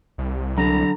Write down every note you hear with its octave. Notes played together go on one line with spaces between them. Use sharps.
C2
D3 F#3 A#5